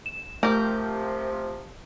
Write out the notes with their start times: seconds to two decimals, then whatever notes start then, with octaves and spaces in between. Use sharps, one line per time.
0.06 E7
0.43 C3 F3 A3 G4 A#4